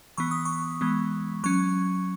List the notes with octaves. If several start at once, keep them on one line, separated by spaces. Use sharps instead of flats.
E3 B3 C#6
D#6
C#6
E3 G#3 B3
F#3 C#4 C#6